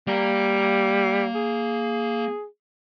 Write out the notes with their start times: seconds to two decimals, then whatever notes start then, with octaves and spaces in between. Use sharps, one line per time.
0.07 G3 A#3 A#5
1.35 G#4